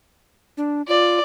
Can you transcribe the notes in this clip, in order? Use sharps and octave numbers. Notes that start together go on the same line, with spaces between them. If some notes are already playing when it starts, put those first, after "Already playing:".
D4
F4 D5